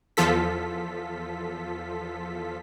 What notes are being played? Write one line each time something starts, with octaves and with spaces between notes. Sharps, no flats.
E2 F3 F4 A4 B6